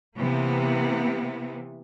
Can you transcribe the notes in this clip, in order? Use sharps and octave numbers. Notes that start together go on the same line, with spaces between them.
C3 E3 A#3 B3